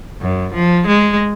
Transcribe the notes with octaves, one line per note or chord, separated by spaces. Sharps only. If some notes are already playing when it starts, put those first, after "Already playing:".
F#2
F3
G#3